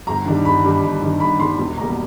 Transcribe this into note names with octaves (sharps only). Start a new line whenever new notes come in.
G1 A#5
G2 D#3 G3
G1 B5
G2 D#3 G3
G1
G2 D#3 G3
G1 B5
G2 D#3 G3 C6
E1
E2 B2 G3 A#3 A#5